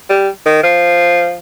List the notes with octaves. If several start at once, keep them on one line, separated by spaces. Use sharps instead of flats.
G3
D#3
F3